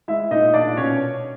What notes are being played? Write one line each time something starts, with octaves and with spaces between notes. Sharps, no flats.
G#3 E4 E5
A#2 D#4 D#5
A#2 D4 D5
B2 C#4 C#5